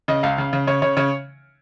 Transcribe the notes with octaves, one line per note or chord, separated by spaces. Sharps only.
C#3 D#5
C#2 F5
C#3
C#3
C#3 C#5
C#3 C#5
C#3 C#5